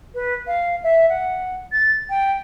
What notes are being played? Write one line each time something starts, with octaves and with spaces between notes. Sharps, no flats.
B4
F5
E5
F#5
A6
G5